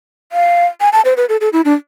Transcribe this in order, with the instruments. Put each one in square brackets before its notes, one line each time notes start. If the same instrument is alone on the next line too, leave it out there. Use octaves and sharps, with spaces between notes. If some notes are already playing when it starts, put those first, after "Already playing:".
[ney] F5
G#5
A5
C5
B4
A4
A4
E4
D4